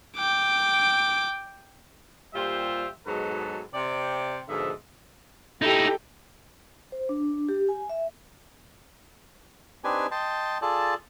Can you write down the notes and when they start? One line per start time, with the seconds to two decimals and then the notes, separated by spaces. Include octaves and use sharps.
0.17 G5 D6
2.34 A#2 G3 F4 G4 C5 E5
3.06 G#2 B2 F#3 G#3 A4 B4
3.74 C3 D5 G5
4.48 G#2 B2 D3 F3 D#5 E5
5.62 D#4 E4 G4 A4
6.92 C5
7.09 D4
7.49 G4
7.69 G#5
7.90 E5
9.84 C4 D4 D#4 G4 B4 G#5
10.11 D#5 G5 A5 C6
10.62 F4 G#4 A4 D5 A5